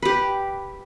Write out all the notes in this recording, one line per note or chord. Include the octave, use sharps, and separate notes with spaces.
G4 B4